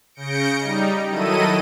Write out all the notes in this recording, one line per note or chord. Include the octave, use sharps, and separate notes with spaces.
C#3 G6 A#6 C#7 D7
G3 D#4
D#3 F#3 E4 A4 D#5 D#7